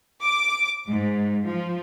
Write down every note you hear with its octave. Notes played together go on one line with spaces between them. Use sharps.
D6
G#2
F3